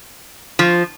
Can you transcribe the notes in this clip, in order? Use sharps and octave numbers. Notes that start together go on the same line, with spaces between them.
F3